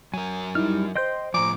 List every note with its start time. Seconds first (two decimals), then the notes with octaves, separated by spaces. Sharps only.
0.14 F#3 A#4 G#5
0.55 G3 D#4 E4 F6
0.95 C5 D#5 G5 C6 G6
1.34 A2 F3 G#5 A#5 D6